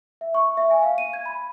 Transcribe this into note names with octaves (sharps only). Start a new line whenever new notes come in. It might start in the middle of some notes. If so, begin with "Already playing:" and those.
E5
C#6
E5
G#5
F5
D#7
G#6
B5